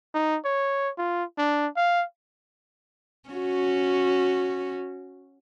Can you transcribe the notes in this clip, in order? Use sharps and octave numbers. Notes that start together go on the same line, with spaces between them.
D#4
C#5
F4
D4
F5
C#4 F#4